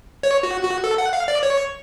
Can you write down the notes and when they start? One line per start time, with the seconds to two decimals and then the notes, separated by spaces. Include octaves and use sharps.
0.23 C#5
0.43 F#4
0.63 F#4
0.84 A4
0.98 F#5
1.13 F5
1.28 D5
1.43 C#5